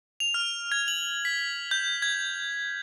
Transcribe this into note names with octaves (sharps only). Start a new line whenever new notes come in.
F7
F6
G#6
F#7
B6
G6
G#6